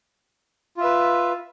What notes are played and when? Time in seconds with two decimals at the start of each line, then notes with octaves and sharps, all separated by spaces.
0.77 F4
0.80 E5
0.83 B4